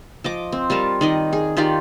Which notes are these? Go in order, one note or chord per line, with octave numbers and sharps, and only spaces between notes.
F3 D#5 D6
C4
G3 F4 A#4 A5
D#3 D5 D#5
G#4
D#3 F4 G4 D5